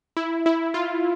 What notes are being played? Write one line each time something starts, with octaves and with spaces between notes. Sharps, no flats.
E4
E4
F4